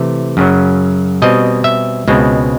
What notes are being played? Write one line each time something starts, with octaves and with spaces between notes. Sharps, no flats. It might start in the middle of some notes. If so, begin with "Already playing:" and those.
Already playing: C3 E3 A3
F#2 C#3 F#3
B2 G3 C4 D#5
E5
C#2 B2 G#3 C4